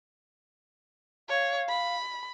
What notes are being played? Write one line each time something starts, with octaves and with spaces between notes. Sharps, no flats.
C#5 F5
B5